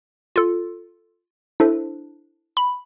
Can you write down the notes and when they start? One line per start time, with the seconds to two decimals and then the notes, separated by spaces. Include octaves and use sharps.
0.36 F4 A4
1.60 D4 E4 A4 C5
2.57 B5